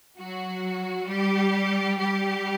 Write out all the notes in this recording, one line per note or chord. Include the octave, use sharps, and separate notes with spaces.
F#3 F#4
G3 G4
G3 G4